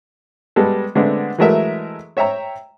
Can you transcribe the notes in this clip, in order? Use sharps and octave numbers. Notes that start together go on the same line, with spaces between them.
G3 G#3 B3 A4
D3 G#3 A3 B3 C4 D4
E3 F#3 G#3 A3 A#4 E5
C#5 E5 G5 A#5